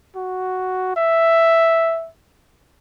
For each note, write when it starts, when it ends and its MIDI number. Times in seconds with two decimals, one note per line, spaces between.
0.16 0.95 66
0.96 2.09 76